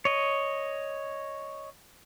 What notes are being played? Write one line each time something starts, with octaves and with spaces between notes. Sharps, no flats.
C#5 D#5